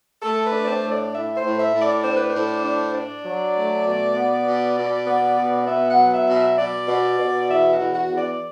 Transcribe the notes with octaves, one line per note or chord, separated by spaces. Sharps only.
A3 A4
B4
D4
D5
C5
A2
D5
A2 E5
C5
A2
E5
A2
D5
D4 C5
B4
C5
A2
D4
D4 D5
F#3
A3
B2
B3
B2
B2
B3
B2
D5
B3 E5
F#5
F#3
E5
B2
E5
B2 D5
B2
B2
E2 E5
F#4
E2
F#4
E2
D5